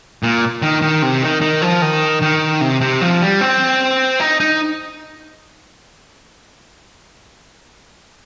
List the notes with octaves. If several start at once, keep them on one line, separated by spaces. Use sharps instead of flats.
A#2
D#3
D#3
C3
D#3
D#3
F3
D#3
D#3
C3
C3
F3
G3
C4
D#4
D#4